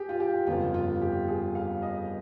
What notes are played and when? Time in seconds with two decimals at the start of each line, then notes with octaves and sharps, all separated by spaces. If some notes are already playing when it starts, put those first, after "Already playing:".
Already playing: G4 G#4
0.09 F4
0.20 G4
0.47 G1 F2 C#3 F4
0.74 F4
1.01 G4
1.28 G#4
1.55 F5
1.82 D#5